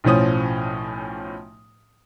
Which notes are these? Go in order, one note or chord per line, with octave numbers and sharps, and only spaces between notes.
B1 A2 F3 C#4 D#6